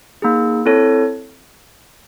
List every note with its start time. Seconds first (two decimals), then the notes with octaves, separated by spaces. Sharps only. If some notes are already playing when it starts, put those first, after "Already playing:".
0.22 A#3 D#4 G#4
0.66 C4 E4 A4 C#5